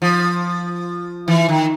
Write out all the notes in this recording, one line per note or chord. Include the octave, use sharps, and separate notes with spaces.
F3
E3
D#3